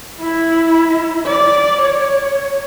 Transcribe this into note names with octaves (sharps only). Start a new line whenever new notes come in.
E4
D5
C#5